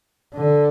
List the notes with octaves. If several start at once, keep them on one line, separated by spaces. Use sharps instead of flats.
D3